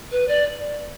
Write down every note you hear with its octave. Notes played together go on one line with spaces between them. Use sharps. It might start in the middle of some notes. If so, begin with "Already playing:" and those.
B4
D5